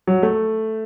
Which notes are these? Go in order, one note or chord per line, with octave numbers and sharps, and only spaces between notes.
F#3
A3